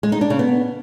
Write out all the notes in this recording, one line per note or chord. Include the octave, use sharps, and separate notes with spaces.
G#3
D#4
D4
C#3
B3